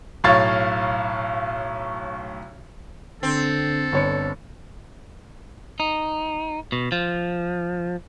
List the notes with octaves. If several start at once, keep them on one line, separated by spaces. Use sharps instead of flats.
B1 A2 C#5 F5 A6
D3 C4 A4
G1 C#5 C#7
D#4
B2
F3